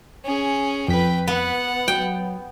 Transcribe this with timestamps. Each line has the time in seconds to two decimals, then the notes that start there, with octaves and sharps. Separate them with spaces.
0.25 C#4 G#4
0.88 F2 B4 G5 B6
1.28 B3 F#5
1.88 F#3 G5